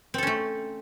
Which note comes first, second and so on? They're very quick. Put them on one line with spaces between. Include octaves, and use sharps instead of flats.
C4 A4 C#4 A3